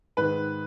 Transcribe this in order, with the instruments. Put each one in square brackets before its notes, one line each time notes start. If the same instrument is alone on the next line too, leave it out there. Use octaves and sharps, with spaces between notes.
[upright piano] G#2 D#3 B4